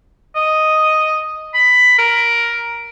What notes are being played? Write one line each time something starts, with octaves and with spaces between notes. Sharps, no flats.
D#5
B5
A#4